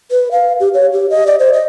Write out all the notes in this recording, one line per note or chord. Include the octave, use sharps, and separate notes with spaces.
B4
F5
G4
C#5
G4
D#5
D5
C5
D#5